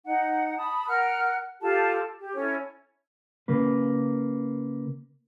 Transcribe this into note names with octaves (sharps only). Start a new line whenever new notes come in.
D#4 F#5
A5 B5 D#6
A#4 F#5 F6 F#6
F4 G4 A4 A5
G4
C#4 E4 A4 C#5
C#3 A#3 B4